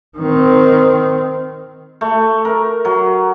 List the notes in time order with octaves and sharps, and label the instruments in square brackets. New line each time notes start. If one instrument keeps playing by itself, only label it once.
[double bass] D#3 C4
[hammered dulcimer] A3
A#4
F#3